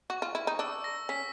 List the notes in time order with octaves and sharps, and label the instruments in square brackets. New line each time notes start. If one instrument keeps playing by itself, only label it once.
[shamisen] F#4 [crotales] C#6
[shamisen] F4
E4
D#4
[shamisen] D4 [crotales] E6
[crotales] A#6
[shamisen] C#4 [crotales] B6